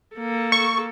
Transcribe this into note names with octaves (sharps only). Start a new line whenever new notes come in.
A#3 A4
C#6